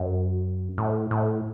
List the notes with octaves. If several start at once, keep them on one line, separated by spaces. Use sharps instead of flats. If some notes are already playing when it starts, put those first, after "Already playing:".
Already playing: F#2
A2
A2